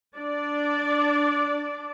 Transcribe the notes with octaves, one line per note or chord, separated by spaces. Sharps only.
D4 D5